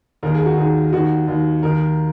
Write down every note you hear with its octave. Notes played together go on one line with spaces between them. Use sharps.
D#2 D#3 A#4
G#4
F#4
D#2 D#3 G#4
D#2 D#3 F#4
D#2 D#3
D#2 D#3 A#4